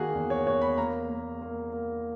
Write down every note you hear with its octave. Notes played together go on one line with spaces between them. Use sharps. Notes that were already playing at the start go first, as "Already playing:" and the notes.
Already playing: D#3 A#3 F#4 G#4
E2
C#5
E2 C#5
B5
A#3 A#5
A#3
A#3
A#3